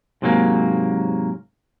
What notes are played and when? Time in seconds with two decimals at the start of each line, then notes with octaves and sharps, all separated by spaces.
0.22 G#2 C3 F#3 A3 A#3